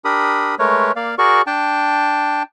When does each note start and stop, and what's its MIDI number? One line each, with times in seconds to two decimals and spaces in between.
0.05 0.55 62
0.05 0.55 67
0.05 0.55 70
0.05 0.55 83
0.05 0.55 87
0.59 0.92 56
0.59 0.92 57
0.59 0.92 70
0.59 0.92 71
0.59 0.92 73
0.96 1.15 58
0.96 1.15 74
0.96 1.15 77
1.18 1.42 66
1.18 1.42 68
1.18 1.42 70
1.18 1.42 74
1.18 1.42 85
1.47 2.43 62
1.47 2.43 79
1.47 2.43 81